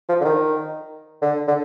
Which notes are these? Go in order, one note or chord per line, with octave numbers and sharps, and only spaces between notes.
F3
D3
D#3
D3
D3